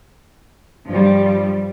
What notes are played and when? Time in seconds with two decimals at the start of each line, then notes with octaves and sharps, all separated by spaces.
0.88 G2 F3 G3